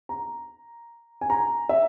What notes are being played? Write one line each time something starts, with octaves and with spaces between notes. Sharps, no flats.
A#5
G#5
A#5
E5